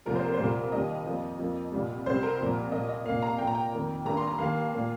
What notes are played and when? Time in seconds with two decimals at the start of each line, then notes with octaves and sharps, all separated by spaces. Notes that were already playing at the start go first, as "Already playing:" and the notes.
0.06 C2 C3 F3 A#3 A#4
0.15 C5
0.25 A#4
0.34 C5
0.39 C2 A#2 G3 A#3 A#4
0.72 D#2 D#3 G3 D#5
1.06 F2 F3 A#3
1.39 F2 F3 A#3
1.72 C2 A#2 G3
2.06 C2 C3 G3 C5
2.23 A#4
2.40 C2 A#2 F3 A#3
2.72 A#2 A#3 D#5
2.89 D#5
3.05 C2 A#2 A#3 F5
3.22 A#5
3.38 A#2 A#3 G5
3.47 A#5
3.55 G5
3.73 F2 D#3 A#3
4.06 G2 D#3 A#3 A#5
4.17 C6
4.27 A#5
4.38 D#2 D#3 A#3 F5
4.74 A#2 A#3